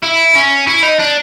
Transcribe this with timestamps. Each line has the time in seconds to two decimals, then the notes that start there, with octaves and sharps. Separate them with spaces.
0.03 E4
0.35 C#4
0.67 E4
0.83 D#4
0.99 D4